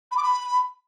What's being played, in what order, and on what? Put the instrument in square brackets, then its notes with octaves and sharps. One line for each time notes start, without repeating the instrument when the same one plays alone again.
[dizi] B5
D6
B5